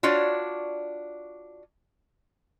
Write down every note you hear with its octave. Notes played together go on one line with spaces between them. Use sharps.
D4 F4 F#4 C#5 D5